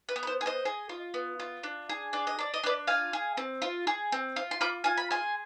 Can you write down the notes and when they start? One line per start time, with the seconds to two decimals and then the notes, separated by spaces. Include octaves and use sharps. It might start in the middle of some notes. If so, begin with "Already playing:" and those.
0.09 B4
0.16 B3
0.23 B4
0.27 C5
0.41 G#4
0.46 C5 D#5
0.65 G#4
0.89 F4
1.14 B3
1.40 F4
1.63 D4
1.89 G#4
2.13 D4 D5
2.27 D#5
2.39 D4 D5
2.54 D#5
2.64 D4 B4 D5
2.87 F4 F5 G#5
3.13 G#4
3.37 C4
3.62 F4
3.87 G#4
4.12 C4
4.36 F4
4.51 C6
4.61 F4 B5 D6
4.84 F4 G#5
4.97 B5
5.11 G#4 G#5 C6